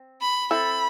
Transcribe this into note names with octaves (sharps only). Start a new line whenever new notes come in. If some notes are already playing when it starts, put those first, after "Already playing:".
Already playing: C4
B5
C4 E4 A4 B5